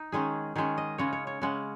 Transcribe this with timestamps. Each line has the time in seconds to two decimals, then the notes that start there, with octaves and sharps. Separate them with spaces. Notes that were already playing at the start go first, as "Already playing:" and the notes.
Already playing: D#4
0.12 D#3 G#3 C#4 G#4
0.56 D#3 G#3 C#4 G#4
0.78 D#5
0.98 C#3 G#3 C#4 C#5
1.13 C#5
1.27 C#5
1.42 C#3 G#3 C#4 F#5